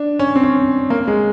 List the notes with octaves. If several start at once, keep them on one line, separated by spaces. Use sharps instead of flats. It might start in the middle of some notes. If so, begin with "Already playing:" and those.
Already playing: D4
C#4
C4
C#4
A#3
G#3